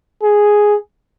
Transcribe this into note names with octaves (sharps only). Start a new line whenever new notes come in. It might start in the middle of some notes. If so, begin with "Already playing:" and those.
G#4